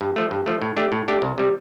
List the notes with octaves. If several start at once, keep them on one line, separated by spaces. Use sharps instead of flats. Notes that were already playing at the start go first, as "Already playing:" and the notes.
G2
F3 A3
G2
F3 A3
A2
A3 D4 G4
A2
A3 D4 G4
C2
C3 G3